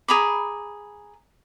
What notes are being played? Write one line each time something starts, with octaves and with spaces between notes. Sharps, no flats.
G#4 A#5 B5 D6